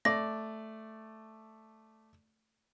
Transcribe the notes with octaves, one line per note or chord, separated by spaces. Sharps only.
A3 D5 A#6